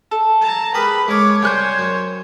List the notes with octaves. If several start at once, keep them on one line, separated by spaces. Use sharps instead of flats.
A4
A5 A#5
G4 G#4 A#4 B4 B5
G#3 A#4 C#5 D6
C3 G3 C5 G5 G#5 F#6 G6
F#2